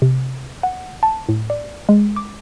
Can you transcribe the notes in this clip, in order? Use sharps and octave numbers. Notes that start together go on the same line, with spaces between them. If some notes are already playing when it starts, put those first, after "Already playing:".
C3
F#5
A5
A2
D5
G#3
D6